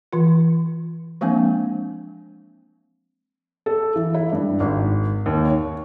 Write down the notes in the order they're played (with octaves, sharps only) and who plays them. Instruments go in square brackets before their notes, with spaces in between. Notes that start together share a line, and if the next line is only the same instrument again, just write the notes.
[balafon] E3 F4
F3 G#3 A#3 C4 D4
[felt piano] A4
E3
E4
G2
G#1
D#2
C#5